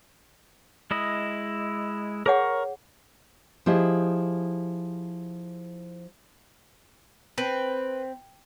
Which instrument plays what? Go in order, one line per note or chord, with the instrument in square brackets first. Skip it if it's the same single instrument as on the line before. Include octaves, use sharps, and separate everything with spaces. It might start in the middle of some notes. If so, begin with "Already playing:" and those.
[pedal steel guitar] G#3 E4 D#5
[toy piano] G#4 C#5 F#5 [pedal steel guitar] A#4 C#6
[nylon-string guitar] F3 E4 G4 G#4 D#5
[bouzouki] C4 [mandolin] B4